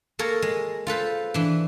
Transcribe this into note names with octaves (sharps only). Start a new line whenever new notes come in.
A#3 A4 A#4 C#5
G#3
F4 A4 B4 C5
E3 D4